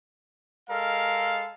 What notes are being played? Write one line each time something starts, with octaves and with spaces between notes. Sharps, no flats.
G#3 A4 A#4 F5